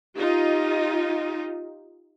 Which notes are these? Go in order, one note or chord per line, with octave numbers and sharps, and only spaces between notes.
D#4 F4 G4